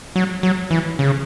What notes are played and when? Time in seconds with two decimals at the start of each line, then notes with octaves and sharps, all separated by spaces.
0.16 F#3
0.43 F#3
0.71 E3
0.99 C#3